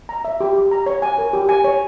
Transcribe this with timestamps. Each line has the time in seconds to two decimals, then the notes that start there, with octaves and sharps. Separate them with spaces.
0.09 A#5
0.25 E5
0.41 G4
0.56 G4
0.71 A#5
0.86 C#5
1.02 G#5
1.18 A#4
1.33 G4
1.49 G#5
1.64 C#5